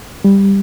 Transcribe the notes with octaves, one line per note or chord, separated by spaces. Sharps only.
G3